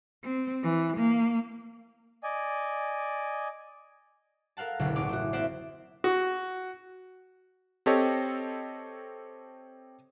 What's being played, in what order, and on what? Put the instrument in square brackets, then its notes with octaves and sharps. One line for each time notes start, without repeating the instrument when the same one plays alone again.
[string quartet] C4
E3
A#3
[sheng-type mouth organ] D5 D#5 G#5
[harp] A4 A#4 F5 F#5 A5
F#1 C#2 B2 D3
A1 C#4 D#4 D6
A3 F#4
A#3 C4 C5 D5 E5 F#5
[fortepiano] F#4
[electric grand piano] C4 G4 A4 C#5 D#5